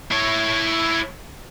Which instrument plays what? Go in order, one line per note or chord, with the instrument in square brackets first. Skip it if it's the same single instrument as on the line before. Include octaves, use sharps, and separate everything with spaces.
[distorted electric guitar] E4 C#5